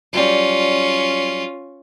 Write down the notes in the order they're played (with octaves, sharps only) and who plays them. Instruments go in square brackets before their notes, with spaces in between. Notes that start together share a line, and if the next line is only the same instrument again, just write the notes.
[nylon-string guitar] F#3 G3 D5 [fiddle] C#4 F4